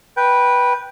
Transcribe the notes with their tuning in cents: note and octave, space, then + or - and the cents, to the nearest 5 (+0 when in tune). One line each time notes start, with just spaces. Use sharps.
B4 -10 G5 +0